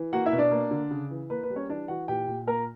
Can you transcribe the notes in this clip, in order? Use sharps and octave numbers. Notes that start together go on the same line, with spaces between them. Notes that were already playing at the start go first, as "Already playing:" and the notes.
Already playing: E3
A#3 F#4 F#5
E4 E5
B2
D4 D5
A#3
D3
C#3
E3
A#3 B4
B4
G3
C#4 C#5
E3 D4 D5
E3 F#4 F#5
A#2 G4 G5
A#2
A#3 A#4 A#5